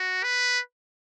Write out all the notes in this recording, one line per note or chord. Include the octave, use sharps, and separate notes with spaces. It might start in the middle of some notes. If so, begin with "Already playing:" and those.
Already playing: F#4
B4